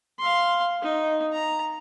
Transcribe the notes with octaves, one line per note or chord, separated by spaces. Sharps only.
F5 C6
D#4
A#5